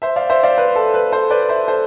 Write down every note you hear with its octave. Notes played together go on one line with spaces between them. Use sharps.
C5 E5
D5 F5
C5 E5
D5 F5
B4
A4
B4
A4 C5
B4 D5
C5 E5
A4 C5